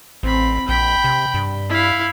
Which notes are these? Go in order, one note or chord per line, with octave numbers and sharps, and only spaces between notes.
A1 C4 B5
A#1 G5 B5
C3
G2
E4 F5